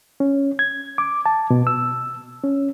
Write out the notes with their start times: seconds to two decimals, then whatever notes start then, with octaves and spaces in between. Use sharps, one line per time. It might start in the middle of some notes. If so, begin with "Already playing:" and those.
0.20 C#4
0.59 G#6
0.98 D6
1.26 A5
1.50 B2
1.67 E6
2.44 C#4